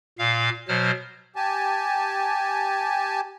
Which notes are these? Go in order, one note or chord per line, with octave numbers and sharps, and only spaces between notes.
A#2 F5
B2 F#3 C5 F6
G4 G#5 A5